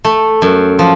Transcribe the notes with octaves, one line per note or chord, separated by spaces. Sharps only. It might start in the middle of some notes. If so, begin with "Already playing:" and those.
A3
F#2
F3